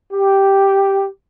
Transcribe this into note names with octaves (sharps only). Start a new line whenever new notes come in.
G4